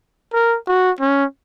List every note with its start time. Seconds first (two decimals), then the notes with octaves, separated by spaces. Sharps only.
0.34 A#4
0.67 F#4
1.01 C#4